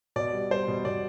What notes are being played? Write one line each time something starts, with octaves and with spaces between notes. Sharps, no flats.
B2 D5
G3
G3 C5
B2
B2 D5